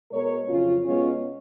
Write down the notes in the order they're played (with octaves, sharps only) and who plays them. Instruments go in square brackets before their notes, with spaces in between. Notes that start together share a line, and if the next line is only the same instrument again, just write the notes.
[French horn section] B2 G#3 B3 A#4 C#5
F2 C#3 F#3 C#4 F4
B2 G#3 B3 C#4 F4